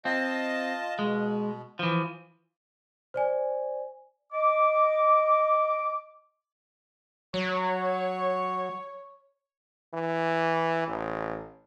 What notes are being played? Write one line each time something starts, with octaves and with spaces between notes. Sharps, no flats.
C4 F4 D#5 A5
B2 G#3
E3 F3
C5 D5 G#5
D#5 D6
F#3 C#5
E3
A1